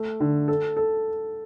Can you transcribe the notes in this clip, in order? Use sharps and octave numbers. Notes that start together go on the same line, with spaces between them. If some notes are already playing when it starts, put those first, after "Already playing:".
Already playing: A3
D3
A4
A4